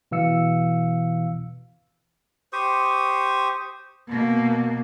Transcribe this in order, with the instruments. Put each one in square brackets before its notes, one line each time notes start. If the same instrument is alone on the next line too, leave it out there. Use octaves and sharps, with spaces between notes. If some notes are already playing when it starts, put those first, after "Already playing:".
[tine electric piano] B2 E3 F5 E6 C#7
[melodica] G4 C5 C#6 D#6
[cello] B2 A#3